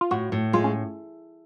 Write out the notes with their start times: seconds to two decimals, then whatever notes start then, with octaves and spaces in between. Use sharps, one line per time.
0.01 F4
0.11 A2 F#4
0.32 A2
0.53 G#3 F4
0.64 C#4